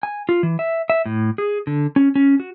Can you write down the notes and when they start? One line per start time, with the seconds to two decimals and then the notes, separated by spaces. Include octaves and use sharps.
0.03 G#5
0.29 F4
0.43 E3
0.59 E5
0.90 E5
1.06 A2
1.38 G#4
1.67 D3
1.96 C#4
2.15 C#4
2.40 F#4